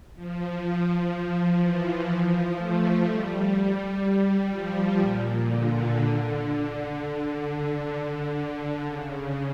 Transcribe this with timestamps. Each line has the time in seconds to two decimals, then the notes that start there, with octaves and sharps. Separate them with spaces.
0.15 F3
1.60 E3
2.08 F3
2.56 A3
3.05 G3
4.50 F3
4.98 A#2
5.46 D3
6.91 D3
7.39 D3
8.85 C#3